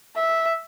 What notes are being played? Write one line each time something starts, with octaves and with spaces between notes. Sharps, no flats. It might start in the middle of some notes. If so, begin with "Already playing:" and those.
E5